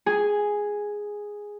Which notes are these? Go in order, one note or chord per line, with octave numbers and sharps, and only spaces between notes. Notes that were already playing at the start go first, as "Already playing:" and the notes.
G#4